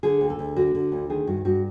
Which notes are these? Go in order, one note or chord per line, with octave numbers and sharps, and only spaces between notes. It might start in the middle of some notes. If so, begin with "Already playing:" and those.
D3 G#4
D2
A4
D2
D3 F#4
D3
D2
D#3 G#4
G2 F#4
G2 F#4